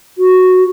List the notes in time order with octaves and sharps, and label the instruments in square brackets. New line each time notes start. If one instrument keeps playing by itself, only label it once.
[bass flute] F#4